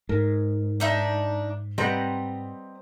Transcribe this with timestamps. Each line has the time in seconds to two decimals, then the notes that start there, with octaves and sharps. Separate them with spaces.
0.09 G#2 A#4
0.80 D4 D#4 E5
1.78 G3 C4 B4 D#5 F#5 A#5